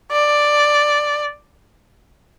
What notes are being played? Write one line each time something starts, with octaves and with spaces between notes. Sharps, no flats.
D5